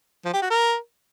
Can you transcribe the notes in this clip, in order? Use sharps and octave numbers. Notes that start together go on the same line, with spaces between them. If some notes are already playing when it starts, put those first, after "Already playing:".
F3
G4
F#4
A#4